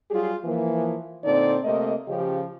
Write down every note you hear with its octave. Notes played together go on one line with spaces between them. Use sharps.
F#3 G3 F4 G4 G#4
E3 F3 A#3
A#2 D3 C4 D#4 A4 D5
C3 A3 A#3 D#5
C#3 F3 G4